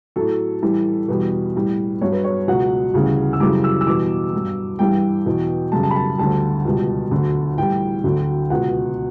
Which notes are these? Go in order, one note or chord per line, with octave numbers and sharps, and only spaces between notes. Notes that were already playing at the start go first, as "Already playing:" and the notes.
A2 F#3 A4
A2 E3 G3
E2 B2 G3 B4
A2 G3
G2 F#3 C#5
B4
C#5
C#2 B2 F#3 F#5
D2 C#3 E3 G3
E6
F#2 C#3 E3 G3 D6
E6
E6
E2 B2 G3 D6
G2 F#3
G2 E3 G3 G5
E2 B2 F#3
F#2 C#3 G3 A5
A5
B5
A5
D2 D3 G3 A5
C#2 B2 G3
D2 D3 F#3
A2 E3 G3 G5
D2 D3 F#3
C#2 B2 F#3 F#5